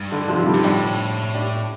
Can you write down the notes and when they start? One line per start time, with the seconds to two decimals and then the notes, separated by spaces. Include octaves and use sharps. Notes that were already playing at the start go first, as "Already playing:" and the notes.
Already playing: G2
0.12 D3
0.28 C3 F3
0.46 D3 G3
0.54 G2
0.63 A2 D4 G4
1.34 D4 G4